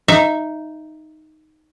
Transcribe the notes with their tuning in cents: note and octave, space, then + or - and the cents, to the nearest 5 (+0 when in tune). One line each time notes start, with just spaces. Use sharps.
D#4 +0 E5 +20